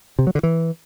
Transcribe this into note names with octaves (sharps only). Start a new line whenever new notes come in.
C3
F#3
D3
E3